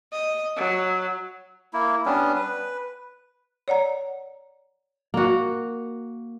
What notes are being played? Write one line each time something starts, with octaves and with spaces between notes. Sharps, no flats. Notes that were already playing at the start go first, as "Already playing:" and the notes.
D#5
F#3
A#3 E4
G3 B3 C#4 D4
B4
C#5 D5 F#5 A#5
A#3 F#4